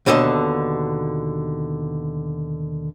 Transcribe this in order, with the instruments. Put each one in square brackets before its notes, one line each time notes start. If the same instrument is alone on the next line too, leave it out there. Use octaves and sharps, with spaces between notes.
[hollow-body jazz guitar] D#2 B2 D3 A4 D#5